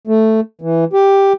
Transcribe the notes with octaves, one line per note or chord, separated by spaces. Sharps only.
A3
E3
G4